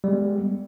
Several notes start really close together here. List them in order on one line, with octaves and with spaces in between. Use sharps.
G3 G#3 B3